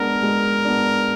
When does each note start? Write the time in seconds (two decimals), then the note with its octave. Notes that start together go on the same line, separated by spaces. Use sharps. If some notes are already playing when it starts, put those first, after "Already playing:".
Already playing: G#3 B3 D4 A#4
0.23 G#3
0.65 B3 D4